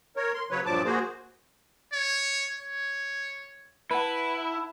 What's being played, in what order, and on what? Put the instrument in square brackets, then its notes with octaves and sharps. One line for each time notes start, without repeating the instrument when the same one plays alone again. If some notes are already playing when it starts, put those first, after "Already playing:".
[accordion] A#4 C#5
C6
C#3 F#3 B4 C#5
G2 A#2 F3 F#3 A5 D6
A#3 F#4 G#4 C5
[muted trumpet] C#5
C#5
[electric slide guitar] E4 [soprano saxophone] B4 [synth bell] F#5 A5 B5